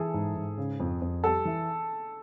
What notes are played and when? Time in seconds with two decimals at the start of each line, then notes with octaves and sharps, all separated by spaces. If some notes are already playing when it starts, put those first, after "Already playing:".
Already playing: E3 G#4 A4
0.14 G#2
0.36 G#2
0.57 C#3
0.80 F2
1.02 F2
1.24 G3 A4
1.45 E3